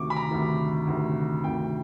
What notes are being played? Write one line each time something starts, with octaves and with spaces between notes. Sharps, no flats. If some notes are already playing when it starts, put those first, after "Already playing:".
Already playing: D2 C3 D#3 C#6 D6
B5
A#5
D2 C3 D#3
D2 C3 D#3
D2 C3 D#3 G5